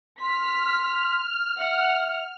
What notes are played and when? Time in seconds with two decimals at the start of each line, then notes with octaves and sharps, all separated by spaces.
0.20 C6 F6 B6
1.58 E5 F#5